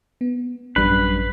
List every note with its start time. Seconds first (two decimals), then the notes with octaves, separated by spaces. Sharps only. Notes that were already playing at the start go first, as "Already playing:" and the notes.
0.21 B3
0.76 A1 F#2 G3 D4 B4 B5 C7